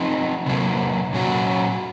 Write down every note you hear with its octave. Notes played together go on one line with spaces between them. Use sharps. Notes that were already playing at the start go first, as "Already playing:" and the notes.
Already playing: F3 C4 D#4
C3 F#3 A#3
A#2 F#3 C#4 F#4